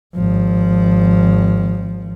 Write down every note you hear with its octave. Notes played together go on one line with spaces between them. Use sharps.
G#1 F3